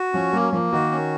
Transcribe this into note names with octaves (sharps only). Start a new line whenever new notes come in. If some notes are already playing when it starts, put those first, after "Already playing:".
Already playing: F#4
F3 C#4
F#3 A#3
F3 A#3
D#3 F#4
C#4